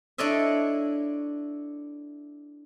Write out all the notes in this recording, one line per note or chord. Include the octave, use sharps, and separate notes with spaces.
D4 E4 A4 C#5 D#5 E5